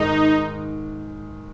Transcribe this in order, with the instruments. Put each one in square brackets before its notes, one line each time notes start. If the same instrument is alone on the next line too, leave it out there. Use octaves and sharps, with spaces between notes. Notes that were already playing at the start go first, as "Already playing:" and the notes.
Already playing: [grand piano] G#2 D#3 G#3 [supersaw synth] D#4